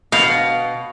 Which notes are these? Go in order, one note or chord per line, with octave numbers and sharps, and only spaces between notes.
B2 F5